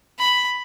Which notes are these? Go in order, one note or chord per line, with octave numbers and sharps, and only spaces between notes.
B5